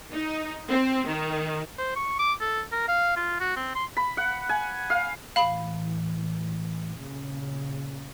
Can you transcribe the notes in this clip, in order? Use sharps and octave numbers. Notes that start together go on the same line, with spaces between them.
D#4
C4
D#3
C5
C#6
D6
A4
A#4
F5
F4
F#4
C4
C6
B5
F#5
G#5
F5
A2 E3 F5 B5
A#2 C#3